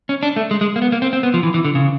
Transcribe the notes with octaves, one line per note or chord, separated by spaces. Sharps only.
C#4
D4
A3
G#3
G#3
A#3
B3
A#3
C4
C4
B3
F3
E3
E3
D3
C#3